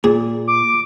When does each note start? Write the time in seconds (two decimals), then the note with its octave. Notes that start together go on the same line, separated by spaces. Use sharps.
0.04 A#2 G#4
0.48 D6